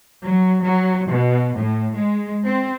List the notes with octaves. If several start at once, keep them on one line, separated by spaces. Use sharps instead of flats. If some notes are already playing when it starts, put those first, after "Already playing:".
F#3
F#3
B2
A2
G#3
C4